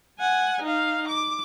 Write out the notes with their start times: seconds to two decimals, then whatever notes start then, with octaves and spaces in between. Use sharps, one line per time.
0.19 F#5 G#5
0.62 D#4 F5
1.08 D6